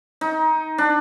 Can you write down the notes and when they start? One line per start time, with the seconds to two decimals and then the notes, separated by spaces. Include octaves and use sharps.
0.21 D#4
0.78 D4